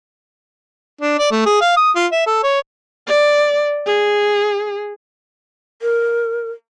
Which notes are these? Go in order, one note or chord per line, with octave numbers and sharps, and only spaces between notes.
D4
D5
A3
G#4
F5
D#6
F4
E5
A4
C#5
D5
G#4
A#4